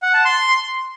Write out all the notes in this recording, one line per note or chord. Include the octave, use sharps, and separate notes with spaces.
F#5
A5
C6